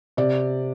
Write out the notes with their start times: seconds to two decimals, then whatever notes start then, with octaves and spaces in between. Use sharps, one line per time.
0.17 C3 D5